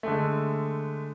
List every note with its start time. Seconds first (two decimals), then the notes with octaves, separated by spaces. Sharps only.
0.03 D3 G#3 A3